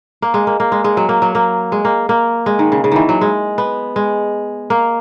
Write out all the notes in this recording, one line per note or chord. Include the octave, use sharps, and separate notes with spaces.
A#3
G#3
A#3
A#3
G#3
G#3
F#3
A#3
F#3
A#3
G#3
A#3
A#3
G#3
D#3
C#3
C#3
D#3 E3
F#3
G#3
B3
G#3
A#3